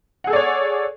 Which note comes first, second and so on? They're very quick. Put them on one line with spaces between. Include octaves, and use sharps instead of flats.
F#5 G#4 A4 D5 C#5